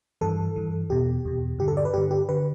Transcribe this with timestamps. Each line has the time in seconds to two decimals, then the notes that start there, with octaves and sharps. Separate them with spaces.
0.21 G2 E3 A4
0.56 G2 E3
0.90 E2 B2 G4
1.25 E2 B2
1.59 G2 D3 G4
1.68 A4
1.77 D5
1.85 B4
1.94 G2 D3 G4
2.11 G4
2.29 D3 B4